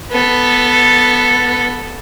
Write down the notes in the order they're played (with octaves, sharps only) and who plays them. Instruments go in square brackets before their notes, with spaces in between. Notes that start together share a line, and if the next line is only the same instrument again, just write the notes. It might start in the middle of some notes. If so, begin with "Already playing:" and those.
[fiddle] B3 A4